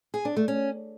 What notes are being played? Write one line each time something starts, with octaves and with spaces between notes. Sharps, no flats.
G#4
D4
A3
C#4